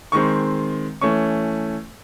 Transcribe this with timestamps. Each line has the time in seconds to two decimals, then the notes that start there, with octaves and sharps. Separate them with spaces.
0.12 D#3 G#3 C4 C#6
1.01 E3 A3 C#4 C#6